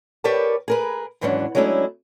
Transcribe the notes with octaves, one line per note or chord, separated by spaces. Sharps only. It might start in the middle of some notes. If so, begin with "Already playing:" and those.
G4 A#4 B4 C#5 D5 A5
G#4 A#4 B4
D#2 G#2 E3 F#3 C#4 D4
F#3 G#3 A3 C#4 D4 E4